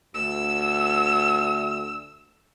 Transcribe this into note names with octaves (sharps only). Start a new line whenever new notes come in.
D2 E6